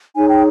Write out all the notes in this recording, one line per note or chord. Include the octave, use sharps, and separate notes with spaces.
D#4 G#4 C#5 G#5
G5